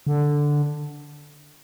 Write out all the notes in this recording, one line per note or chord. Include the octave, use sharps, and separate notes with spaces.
D3